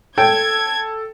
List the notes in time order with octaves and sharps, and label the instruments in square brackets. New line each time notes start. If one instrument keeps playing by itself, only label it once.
[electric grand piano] A4 [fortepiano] G5 [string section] G#6